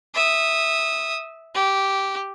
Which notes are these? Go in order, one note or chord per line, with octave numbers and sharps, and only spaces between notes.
E5 D#6
G4